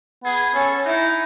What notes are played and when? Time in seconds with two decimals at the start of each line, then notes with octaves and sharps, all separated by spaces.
0.24 B3 G#4
0.55 C#4 A4
0.85 D#4 E4